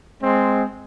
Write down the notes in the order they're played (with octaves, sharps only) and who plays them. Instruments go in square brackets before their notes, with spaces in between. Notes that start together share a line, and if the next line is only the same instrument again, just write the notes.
[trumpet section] G#3 C4